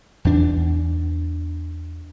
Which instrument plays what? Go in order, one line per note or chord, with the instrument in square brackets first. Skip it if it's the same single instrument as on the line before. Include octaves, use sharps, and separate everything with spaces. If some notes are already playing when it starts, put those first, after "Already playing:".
[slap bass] E2 D4